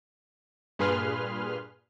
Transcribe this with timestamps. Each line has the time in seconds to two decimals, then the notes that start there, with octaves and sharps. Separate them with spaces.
0.79 G2 A#2 G#4 B4 C6 F6